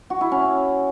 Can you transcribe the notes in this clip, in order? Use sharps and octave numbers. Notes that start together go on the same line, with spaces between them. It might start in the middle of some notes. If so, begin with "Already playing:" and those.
F#4
E4
C#4